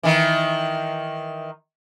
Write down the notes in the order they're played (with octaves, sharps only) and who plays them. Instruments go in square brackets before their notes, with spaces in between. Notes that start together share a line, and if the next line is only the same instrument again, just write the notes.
[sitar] D#3 E3